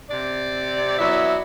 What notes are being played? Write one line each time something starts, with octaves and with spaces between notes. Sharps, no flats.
C3 D5
F#3 B3 E4 D5 E5